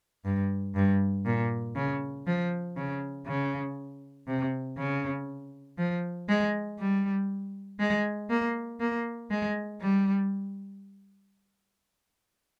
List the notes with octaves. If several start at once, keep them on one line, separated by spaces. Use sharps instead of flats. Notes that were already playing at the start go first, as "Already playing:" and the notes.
G2
G2
A#2
C#3
F3
C#3
C#3
C3
C#3
F3
G#3
G3
G#3
A#3
A#3
G#3
G3